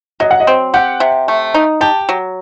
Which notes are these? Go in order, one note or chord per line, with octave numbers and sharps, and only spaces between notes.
F#3 D#5
F#5
D#5
C4
G4 F#5
C3
A3
D#4
G4 A5
F#3